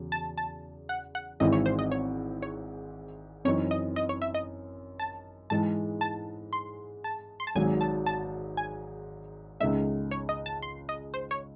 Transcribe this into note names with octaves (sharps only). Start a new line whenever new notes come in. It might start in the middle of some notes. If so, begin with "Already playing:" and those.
Already playing: E2 C#3 F#3
A5
A5
F#5
F#5
G#1 G#2 E3 C4 E4 D#5
C#5
C5
D#5
C#5
C#5
F#2 E3 C4 D#4 C#5
D#5
D#5
C#5
E5
D#5
A5
G#2 E3 G#3 A5
A5
C6
A5
C6
A5
G#1 G#2 F#3 G#5
A5
A5
G#5
C#2 C#3 G#3 D#4 E5
C#5
D#5
A5
C6
D#5
C5
C#5